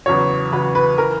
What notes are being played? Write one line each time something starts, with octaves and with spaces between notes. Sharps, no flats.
E2 C#3 F#3 C#5
E2 C#3 F#3 B4
B4
E3 A#4